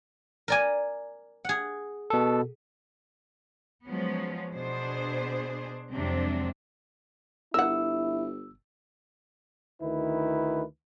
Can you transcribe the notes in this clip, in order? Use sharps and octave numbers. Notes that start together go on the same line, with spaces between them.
A#4 D5 G#5
G#4 F#5
B2 A4
F3 F#3 G#3 B3 C#4
B2 D4 G#4 C5
F2 C3 F#3 G#3 C4 D4
G1 E4 A#4 F#5 E6
D2 D#3 E4 B4